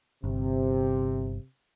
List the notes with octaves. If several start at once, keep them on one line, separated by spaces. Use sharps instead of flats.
G1 C3